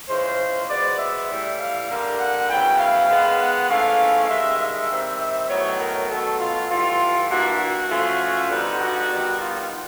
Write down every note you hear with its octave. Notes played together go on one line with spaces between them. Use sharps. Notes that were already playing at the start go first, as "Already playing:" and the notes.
E3 G#3 C#4 F4 C5
B2 G#3 B3 D5
E5
A2 E3 G3
F5
D3 G3 A#3
F#5
C#3 F#3 B3 E4 G5
F5
D#3 G#3 B3
F#5
G#2 E3 A3 C#4 F5
G2 D#3 G#3 E5
E5
D#3 G3 C4
E5
A2 F#3 B3 D#4 C#5
A#4
B2 F#3 A3 A4
F4
G2 E3 A3 F4
G2 E3 G3 A#3 D4 F#4
F#4
F3 A3 C#4 F4
D3 G3 B3 D#4
F#4
D#3 G3 B3 D#4
F4